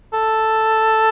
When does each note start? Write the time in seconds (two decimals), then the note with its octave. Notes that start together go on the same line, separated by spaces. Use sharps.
0.13 A4